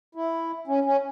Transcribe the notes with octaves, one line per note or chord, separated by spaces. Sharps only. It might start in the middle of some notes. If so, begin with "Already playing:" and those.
E4
C#4
C#4